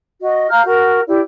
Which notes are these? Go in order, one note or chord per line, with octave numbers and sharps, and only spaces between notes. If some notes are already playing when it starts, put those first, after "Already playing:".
F#4 D#5
F5 A#5 F6 G6
F#4 A#4
E4 G4 D5